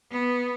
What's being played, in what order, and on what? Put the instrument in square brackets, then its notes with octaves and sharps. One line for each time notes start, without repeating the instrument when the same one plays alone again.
[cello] B3